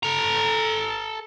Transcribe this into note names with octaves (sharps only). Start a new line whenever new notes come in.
A4 A#5